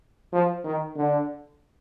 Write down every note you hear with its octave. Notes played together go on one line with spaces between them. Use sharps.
F3
D#3
D3